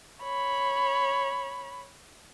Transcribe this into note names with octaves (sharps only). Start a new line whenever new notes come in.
C#5 B5